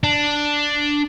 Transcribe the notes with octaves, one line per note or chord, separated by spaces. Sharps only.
D4